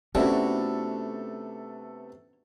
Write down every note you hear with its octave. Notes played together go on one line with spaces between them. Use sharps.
C3 A3 B3 C#4 D4 E4 F#4 A4